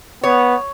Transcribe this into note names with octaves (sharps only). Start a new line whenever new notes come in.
B3 C#5